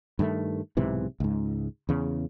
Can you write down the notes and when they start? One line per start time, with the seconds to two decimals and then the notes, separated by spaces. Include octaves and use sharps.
0.19 G2 D#3 A3
0.77 B1 G#2 C3 E3
1.20 C#2 G#2
1.89 E2 C#3